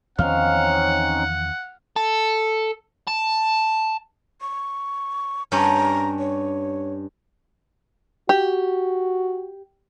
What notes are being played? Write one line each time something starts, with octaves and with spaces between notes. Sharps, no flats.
E2 D#3 F3 C4 C#4 D#4 F5 F#5
A4
A5
C#6
G2 C#4 G4 A#5
C#5
F#4 G4